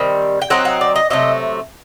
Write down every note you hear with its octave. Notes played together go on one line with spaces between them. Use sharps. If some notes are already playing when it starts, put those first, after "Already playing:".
Already playing: D#3 G3 C4
G5
F#3 C4 D#4 F#5
F#5
D5
D#5
C3 F#3 A3 D#5